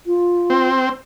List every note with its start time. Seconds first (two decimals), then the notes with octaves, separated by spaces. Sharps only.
0.06 F4
0.50 C4